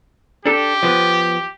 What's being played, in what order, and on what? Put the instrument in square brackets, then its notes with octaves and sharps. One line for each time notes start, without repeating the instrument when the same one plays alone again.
[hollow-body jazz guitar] D4 A4 [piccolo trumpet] G4
[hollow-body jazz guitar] F3 B3